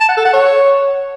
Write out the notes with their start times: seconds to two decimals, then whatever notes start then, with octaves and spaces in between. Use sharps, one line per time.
0.01 A5
0.09 F#5
0.17 A4
0.25 F#5
0.33 C#5